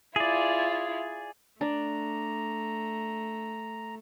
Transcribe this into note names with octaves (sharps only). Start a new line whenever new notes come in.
E4 F4 G#4 D5
A3 D4 A#5